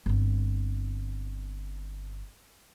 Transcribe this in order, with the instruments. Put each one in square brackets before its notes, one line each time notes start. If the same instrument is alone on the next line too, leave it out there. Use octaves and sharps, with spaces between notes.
[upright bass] G1 C4